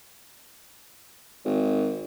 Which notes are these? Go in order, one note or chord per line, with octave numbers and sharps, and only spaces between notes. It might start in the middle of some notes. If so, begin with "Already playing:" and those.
G#1